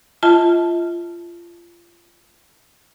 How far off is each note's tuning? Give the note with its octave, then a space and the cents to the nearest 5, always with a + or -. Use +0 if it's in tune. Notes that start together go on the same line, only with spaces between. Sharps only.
F4 -25 E5 -45 A5 +0